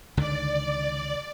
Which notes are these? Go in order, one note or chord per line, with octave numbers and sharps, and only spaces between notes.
C#2 D3 D#3 D5